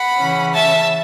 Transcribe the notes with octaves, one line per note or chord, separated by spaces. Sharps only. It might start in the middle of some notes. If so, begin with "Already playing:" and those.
Already playing: F#5 B5
C#3 E3 C#4
E5 A5